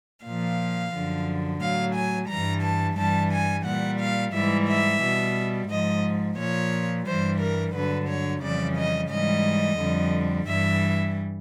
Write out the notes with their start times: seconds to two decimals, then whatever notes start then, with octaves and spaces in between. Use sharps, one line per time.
0.25 A#2 F3 F5
0.93 F#2 D3 F3
1.61 A2 F#3 F5
1.95 G#5
2.29 G2 E3 G3 A#5
2.63 A5
2.97 G2 E3 G3 A5
3.31 G#5
3.66 A#2 G3 F#5
4.00 F5
4.33 G#2 E3 G3 E5
4.68 E5
5.02 B2 G3
5.69 G#2 F3 D#5
6.38 A#2 F3 C#5
7.06 G2 E3 G3 C5
7.40 A#4
7.75 G2 D3 F#3 B4
8.08 C#5
8.42 F2 C#3 E3 G3 D5
8.76 D#5
9.10 G#2 E3 G3 D#5
9.78 F2 D3 G3
10.47 G2 E3 G3 E5